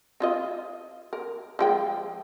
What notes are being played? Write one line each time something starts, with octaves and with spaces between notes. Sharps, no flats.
C4 F4 D#5
A#4
F3 G#3 G5